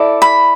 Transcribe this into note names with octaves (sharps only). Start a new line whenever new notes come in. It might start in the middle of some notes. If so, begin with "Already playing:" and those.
Already playing: E4 A4 D5
B5